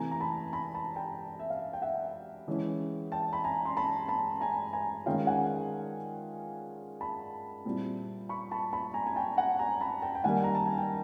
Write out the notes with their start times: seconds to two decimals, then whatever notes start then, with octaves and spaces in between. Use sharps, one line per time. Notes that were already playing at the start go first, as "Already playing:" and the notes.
Already playing: C3 E3 A3 G#5 A#5
0.11 A#5
0.20 A5 B5
0.53 A5 B5
0.75 A5 B5
0.96 G5 A5
1.39 E5
1.50 F5
1.73 G5
1.82 E5 F#5
2.48 E3 G#3 C#4 E4
3.12 G5 A5
3.33 B5
3.44 G#5 A#5
3.65 C6
3.77 A5 B5
4.08 A5 B5
4.41 G#5 A#5
4.73 G#5 A#5
5.06 D#3 G#3 C#4 F4 F5 G5
5.27 F#5 G#5
7.01 A5 B5
7.65 A#2 G3 C4 E4
8.29 B5 C#6
8.51 A5 B5
8.73 A5 B5
8.94 G#5 A#5
9.06 G#5
9.16 G5 A5
9.37 F#5 G#5
9.59 G#5 A#5
9.81 A5 B5
10.02 G5 A5
10.15 G5
10.24 D#3 G3 A#3 F#5 G#5
10.44 A#5
10.55 A5
10.66 G#5
10.78 G5